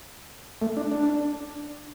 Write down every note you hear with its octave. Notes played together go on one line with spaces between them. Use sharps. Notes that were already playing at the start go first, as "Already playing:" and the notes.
A3
D4
D4